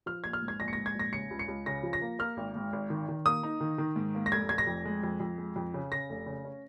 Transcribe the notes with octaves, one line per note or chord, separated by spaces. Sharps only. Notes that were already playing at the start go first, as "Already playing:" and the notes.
F3 F6
A#1 G#6
F6
G#2
G#6
A#1 A#6
C#7
G#2 A#6
G#6
A#1 A#6
C#3 C#7
C#2
C#7
C#2
C#3 A#6
F3
A#6
A#3
A#3 F6
G#1
G#2
G#1
D#3
D#3
A#3 D#6
D#4
D#3
D#3
G#2
A#3
A#6
F1 G#6
F1 G#6
A#6
F2
G#3
F2
F2
G#3
F2
C#3
C#3 A#6
F1
C#3
C#4